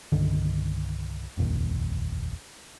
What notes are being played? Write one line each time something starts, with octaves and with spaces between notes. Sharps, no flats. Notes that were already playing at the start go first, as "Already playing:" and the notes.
C2 G2 D3 D#3
F1 A#1 D#2